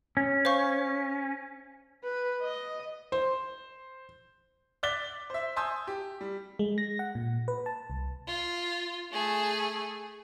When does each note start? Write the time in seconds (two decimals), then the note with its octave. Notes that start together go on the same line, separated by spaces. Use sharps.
0.17 C#4
0.45 C5 F5 C#6
2.04 B4
2.42 D#5
3.12 C5
4.83 D5 D6 F#6 A6 B6 G7
5.30 C5 E5
5.56 G#5 A5 C6 D#6 E6 G6
5.87 G4
6.21 G3
6.59 G#3
6.78 A#6
6.99 F#5
7.15 A#2
7.48 B4
7.66 A5
7.90 C2
8.28 F4
9.12 A3 G#4